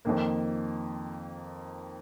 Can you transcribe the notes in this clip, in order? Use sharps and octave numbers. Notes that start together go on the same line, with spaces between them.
F2 D#3 A#3